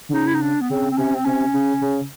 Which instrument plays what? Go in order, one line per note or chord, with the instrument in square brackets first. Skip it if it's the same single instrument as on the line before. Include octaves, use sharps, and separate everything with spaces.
[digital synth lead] D3
[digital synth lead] C#3 [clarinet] D#4
[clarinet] E4
D#4
D4
B3
[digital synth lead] C#3 [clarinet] C4
[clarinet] C4
[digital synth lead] C3 [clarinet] C#4
[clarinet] C4
[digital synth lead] C3 [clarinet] C#4
[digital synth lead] C#3
C#3